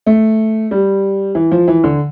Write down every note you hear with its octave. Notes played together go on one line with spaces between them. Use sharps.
A3
G3
E3
F3
E3
D3